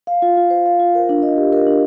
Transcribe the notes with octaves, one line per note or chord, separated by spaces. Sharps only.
F5
F4
F4
C5
F5
F4
A#4
D4
D#5
G4
A#4
D4